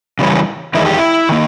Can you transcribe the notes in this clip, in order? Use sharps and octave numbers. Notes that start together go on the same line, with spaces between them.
C#3 E3 G3 C#4
E2 D#3 G#3 E4
G4
E4
D#3 A#3